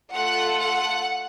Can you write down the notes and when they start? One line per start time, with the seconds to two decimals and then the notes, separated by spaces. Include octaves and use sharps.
0.13 A3 F4 A4 F#5
0.60 F#5